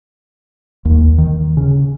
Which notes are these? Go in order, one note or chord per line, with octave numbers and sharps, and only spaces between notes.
D#2
D#3
C#3